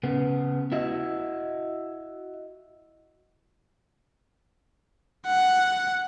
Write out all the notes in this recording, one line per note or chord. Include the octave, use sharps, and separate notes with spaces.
C#3 B3
E4 F#4 D#5 E5
F#5